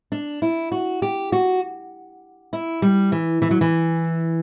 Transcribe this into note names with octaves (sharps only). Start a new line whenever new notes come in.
D4
E4
F#4
G4
F#4
E4
G3
E3
E3
F#3
E3